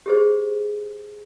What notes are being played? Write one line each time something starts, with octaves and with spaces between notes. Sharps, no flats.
G4 G#4 C5